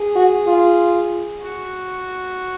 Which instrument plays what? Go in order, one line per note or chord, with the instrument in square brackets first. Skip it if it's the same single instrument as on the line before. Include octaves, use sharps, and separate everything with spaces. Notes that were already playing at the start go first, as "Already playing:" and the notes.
Already playing: [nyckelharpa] G#4
[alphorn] F#4
F4
[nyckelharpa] F#4